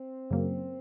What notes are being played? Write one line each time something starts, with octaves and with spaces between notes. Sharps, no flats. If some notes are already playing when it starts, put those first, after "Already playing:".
Already playing: C4
F#2 C#3 F#3 A#3